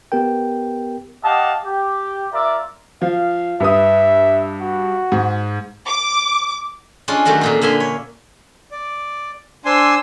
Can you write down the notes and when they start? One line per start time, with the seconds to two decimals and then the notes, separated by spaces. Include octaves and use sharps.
0.12 B3 G4 A#4 G5
1.24 G4 D5 D#5 F5 F#5 A5
1.64 G4
2.32 F4 A#4 D5 E5
3.02 F3 F5
3.60 G2 B4 E5 D#6
4.61 F#4
5.12 G#2
5.87 D6
7.08 G#3 C#4 D4 F4
7.25 D#3 F#3 A3 D4 F#4
7.41 F2 A#2 F4
7.61 D3 A#3 E5 G#5 C6
7.80 C#5
8.71 D5
9.65 D4 C5 G#5 C6 E6